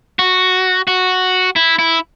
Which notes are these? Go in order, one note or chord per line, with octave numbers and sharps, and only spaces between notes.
F#4
F#4
E4
E4